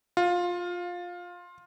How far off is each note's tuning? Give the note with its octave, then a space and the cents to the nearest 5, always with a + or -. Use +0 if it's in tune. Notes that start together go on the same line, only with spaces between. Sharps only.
F4 +15